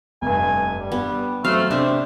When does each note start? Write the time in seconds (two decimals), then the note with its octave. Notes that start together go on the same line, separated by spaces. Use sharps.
0.22 F1 G2 G#5
0.80 G3
0.92 G2 B3
1.44 F#3 A3 C4 F5 F6
1.71 C3 D4 C5 E5